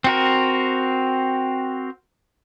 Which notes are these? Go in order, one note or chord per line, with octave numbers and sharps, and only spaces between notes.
C4 F#4 A#4